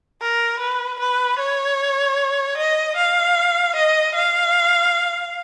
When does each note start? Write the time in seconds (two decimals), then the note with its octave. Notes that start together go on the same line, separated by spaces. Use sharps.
0.21 A#4
0.59 B4
1.00 B4
1.39 C#5
2.57 D#5
2.96 F5
3.75 D#5
4.14 F5